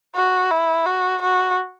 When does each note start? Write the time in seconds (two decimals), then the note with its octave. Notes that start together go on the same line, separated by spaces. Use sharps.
0.16 F#4
0.51 E4
0.86 F#4
1.22 F#4